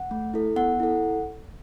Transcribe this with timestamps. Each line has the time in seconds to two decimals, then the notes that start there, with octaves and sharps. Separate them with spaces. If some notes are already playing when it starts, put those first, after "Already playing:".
Already playing: F#5
0.11 A3
0.34 E4 A4
0.56 B3 F#5
0.80 E4 A4